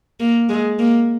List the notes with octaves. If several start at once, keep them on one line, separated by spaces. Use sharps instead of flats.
A#3
G#3
A#3